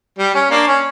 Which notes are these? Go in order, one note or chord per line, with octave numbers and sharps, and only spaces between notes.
G3
C#4
A#3 D4
C#4